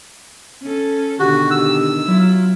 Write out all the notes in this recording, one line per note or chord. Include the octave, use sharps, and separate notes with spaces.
C#4 A4
B2 D3 D#3 F#4 G4
E6
F#3 E4 F4